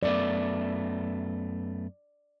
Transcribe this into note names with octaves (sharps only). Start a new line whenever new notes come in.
F#2 A3 B3 D5